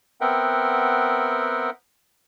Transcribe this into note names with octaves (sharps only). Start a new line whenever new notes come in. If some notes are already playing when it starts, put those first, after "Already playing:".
B3 C4 A#4 E5 F#5 G5